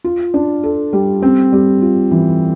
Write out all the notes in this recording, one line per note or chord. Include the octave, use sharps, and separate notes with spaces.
F4
D4
A4
G3
C4
G3
F4
E3